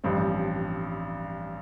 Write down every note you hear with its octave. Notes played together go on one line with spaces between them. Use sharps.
A1 G2 F3 C4